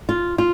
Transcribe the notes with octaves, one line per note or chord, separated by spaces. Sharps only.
F4
F4